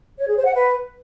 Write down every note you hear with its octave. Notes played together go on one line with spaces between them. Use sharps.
C#5
G#4
C5
F#5
B4